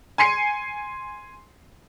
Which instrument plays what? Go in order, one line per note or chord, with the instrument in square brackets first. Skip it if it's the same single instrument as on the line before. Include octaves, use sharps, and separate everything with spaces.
[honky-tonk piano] G#5 C6 C7 C#7